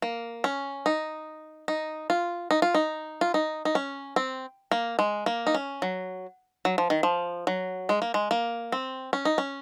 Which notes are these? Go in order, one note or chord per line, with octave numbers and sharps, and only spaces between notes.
A#3
C#4
D#4
D#4
F4
D#4
F4
D#4
F4
D#4
D#4
C#4
C4
A#3
G#3
A#3
D#4
C#4
F#3
F#3
F3
D#3
F3
F#3
G#3
A#3
G#3
A#3
C4
C#4
D#4
C#4